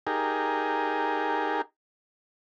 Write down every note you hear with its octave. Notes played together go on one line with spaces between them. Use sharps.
D#4 G4 G#4 A#4